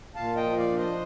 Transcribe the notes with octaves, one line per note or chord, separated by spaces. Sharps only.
A#2 F5 A5
D#5 G5
F3
D5 F5
D4
C5 D#5